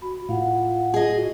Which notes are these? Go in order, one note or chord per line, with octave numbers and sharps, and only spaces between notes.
F#4 B5
A2 F4 F5 F#5
G#4 D#5
F#4